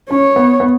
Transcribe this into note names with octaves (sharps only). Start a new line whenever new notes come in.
C#4 C#5
B3
B3